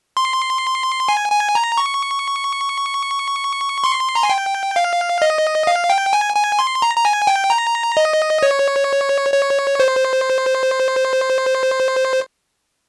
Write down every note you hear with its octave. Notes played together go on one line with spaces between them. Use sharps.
C6
G#5
G#5
A#5
C#6
C6
A#5
G#5
G5
F5
D#5
F5
G5
G#5
G#5
C6
A#5
A#5
G#5
G5
A#5
D#5
C#5
C#5
C5